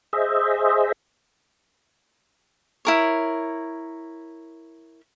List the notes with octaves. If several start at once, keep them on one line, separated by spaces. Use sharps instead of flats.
G#4 C5 D#5 E5
E4 A#4 C#5